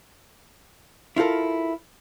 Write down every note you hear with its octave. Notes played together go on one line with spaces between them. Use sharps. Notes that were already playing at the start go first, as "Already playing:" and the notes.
E4 F4 G4 A4 A#4